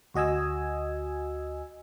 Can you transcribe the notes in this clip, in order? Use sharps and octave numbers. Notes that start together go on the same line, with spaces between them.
D2 F#4 D#5 G#5 E6